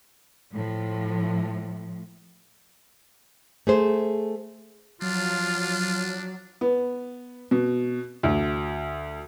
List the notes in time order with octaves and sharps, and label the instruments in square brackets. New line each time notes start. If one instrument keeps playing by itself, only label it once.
[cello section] A2 F3
[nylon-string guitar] A3 G#4 C5
[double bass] F3 [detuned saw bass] F#3 [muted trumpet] D4 [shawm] F4
[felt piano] B3
B2
D2